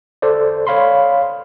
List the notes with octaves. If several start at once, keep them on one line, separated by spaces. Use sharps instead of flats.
A4 C5 D5
C#5 F5 B5 C6